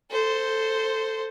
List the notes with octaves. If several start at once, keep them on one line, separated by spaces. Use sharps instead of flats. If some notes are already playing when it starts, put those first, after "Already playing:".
A4 C5